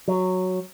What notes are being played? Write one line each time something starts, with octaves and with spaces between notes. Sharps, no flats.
F#3